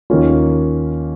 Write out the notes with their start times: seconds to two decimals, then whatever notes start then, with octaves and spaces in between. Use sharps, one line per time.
0.10 D#2 D#3 A#3 C#4 F4